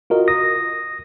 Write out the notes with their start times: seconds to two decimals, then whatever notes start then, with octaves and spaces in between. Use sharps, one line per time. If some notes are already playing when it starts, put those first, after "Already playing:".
0.10 F4 F#4 A#4 D#5
0.28 D#6 A#6